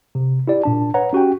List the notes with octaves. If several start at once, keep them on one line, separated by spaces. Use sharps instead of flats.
C3
E4 G4 D5
A#2 D4 A5
B4 C#5 F#5 A#5
C#4 F#4 G4 G5